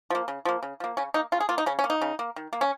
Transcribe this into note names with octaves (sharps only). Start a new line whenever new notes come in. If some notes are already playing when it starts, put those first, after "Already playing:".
F3 A#3
C#3
F3 A#3
C#3
F3 A#3
C#3 C#4
A#3 D#4
C#3 F4
G#4
A#3 F4
D#4
C#3 C#4
C#4
A#3
D#4
C#3
A#3
D#3
A#3
C#4